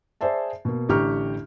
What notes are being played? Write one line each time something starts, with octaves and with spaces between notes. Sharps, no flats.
G#4 C5 D5 E5 A5
B2 A#3
A1 D3 G4 A#5 C#6 F6